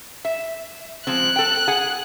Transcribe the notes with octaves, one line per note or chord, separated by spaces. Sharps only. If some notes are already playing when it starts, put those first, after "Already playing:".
E5
F3 G#3 C4 F#6
A4 G5
G#4 F#5 G#5